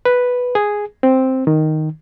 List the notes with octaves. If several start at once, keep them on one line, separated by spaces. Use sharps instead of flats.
B4
G#4
C4
D#3